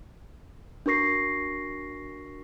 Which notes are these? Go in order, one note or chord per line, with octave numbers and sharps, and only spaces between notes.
D4 F#4 A#4 C#6 A#6 C7